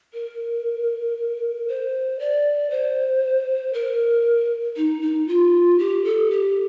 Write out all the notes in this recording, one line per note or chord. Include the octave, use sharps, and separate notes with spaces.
A#4
C5
D5
C5
A#4
D#4
D#4
F4
G4
A4
G4